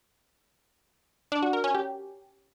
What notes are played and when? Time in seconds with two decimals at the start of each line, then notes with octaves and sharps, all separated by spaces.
1.32 D4
1.42 F#4
1.53 A#4
1.64 C#4
1.75 G4